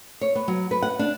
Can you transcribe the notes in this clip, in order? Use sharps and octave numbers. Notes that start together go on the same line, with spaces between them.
C#5
B3
F#3
B4
F#5
D4